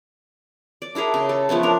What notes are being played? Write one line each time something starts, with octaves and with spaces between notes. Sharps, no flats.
D5
D4 E4 G#4 A#4
C#3
A4
F3 A3 B3 C#4
D4 A#4